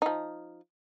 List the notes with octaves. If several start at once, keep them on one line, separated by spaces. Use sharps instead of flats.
F3 D#4